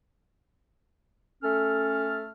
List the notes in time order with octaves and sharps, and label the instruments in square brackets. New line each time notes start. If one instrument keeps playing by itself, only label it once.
[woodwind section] A3 C#4 A4 F6